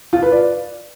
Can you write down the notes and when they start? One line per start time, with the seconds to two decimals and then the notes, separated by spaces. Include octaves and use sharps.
0.13 F4
0.22 B4
0.32 D5